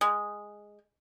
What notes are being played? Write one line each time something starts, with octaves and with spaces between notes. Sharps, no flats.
G#3